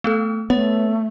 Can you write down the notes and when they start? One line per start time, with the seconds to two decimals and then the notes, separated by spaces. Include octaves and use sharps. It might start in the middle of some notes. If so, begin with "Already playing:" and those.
0.04 A3 B3 A4
0.50 A3 B3 C#5